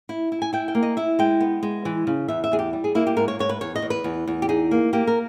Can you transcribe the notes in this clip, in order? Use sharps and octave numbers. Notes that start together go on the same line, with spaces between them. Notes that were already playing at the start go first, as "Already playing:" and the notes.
E4
E4
G#5
E4 G5
G5
A#3
D#5
E4 E5
G#3 G5
B3
G#3
E3
C#3
E2 E5
E5
E2 G#4
G4
G3
G#4
A#3 E4
G4
G#2 A#4
C#5
G#2 C#5
B4
E2 C#5
D#5
E2
B4
E2
E2
G4
D#4 G#4
A#3
A#3 G4
A#4